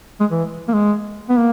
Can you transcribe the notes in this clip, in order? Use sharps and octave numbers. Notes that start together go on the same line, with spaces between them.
G#3
E3
A#3
G#3
B3
A#3